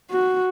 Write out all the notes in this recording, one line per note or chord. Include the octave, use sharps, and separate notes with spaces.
F#4